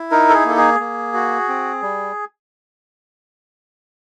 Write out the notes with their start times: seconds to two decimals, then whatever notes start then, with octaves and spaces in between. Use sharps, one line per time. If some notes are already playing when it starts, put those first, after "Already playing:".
Already playing: E4
0.11 D#4 A#4
0.29 A4
0.34 G#4
0.45 A#3 A4
0.57 G#4
0.80 A#3
1.14 F#4
1.48 C4
1.82 G3